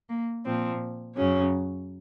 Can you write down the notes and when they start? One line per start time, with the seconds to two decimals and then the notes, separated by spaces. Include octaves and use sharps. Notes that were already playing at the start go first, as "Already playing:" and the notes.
0.09 A#3
0.45 A#2 F3 C4
1.17 F#2 C#3 F#3 C#4